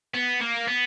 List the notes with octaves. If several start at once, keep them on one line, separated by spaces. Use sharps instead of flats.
B3
A#3
B3